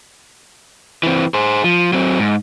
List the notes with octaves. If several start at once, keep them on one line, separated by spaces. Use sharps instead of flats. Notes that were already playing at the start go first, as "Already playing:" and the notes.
E3 C4
G#4 C5
F3
F#3 C4
G#2